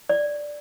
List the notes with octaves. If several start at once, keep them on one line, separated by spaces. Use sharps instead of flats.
D5